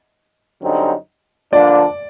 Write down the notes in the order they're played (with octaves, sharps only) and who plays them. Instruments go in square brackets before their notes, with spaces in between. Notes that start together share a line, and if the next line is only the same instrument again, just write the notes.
[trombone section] F#2 D3 G3 C4 D#4
[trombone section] D3 F3 A#3 D4 [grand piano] D5